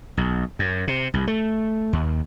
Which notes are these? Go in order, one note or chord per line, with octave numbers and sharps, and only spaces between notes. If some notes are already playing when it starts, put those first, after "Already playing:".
B1
F#2
C3
C2
A3
D#2